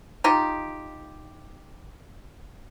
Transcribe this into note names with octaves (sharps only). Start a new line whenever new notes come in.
D#4 F4 G4